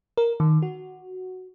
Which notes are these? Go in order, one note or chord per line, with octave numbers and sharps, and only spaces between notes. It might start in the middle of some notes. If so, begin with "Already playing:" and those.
A#4
D#3
F#4